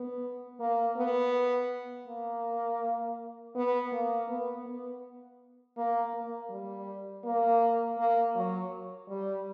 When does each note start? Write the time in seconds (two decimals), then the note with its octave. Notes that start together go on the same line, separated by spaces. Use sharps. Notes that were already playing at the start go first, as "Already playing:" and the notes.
Already playing: B3
0.60 A#3
0.97 B3
2.07 A#3
3.55 B3
3.92 A#3
4.29 B3
4.67 B3
5.77 A#3
6.14 A#3
6.50 G3
7.24 A#3
7.98 A#3
8.36 F#3
9.09 G3